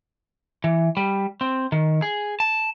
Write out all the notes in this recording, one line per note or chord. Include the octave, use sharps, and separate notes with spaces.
E3
G3
C4
D#3
G#4
A5